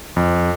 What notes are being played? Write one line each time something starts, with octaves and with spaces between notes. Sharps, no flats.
F2